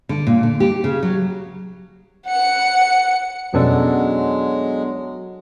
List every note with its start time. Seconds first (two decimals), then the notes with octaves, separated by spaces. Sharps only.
0.09 D3
0.27 A#2
0.43 D3
0.60 G4
0.84 C#3
1.03 F#3
2.28 F#5 C#7
3.54 F2 B2 F#3 G#3 B3 C#4 D4 A4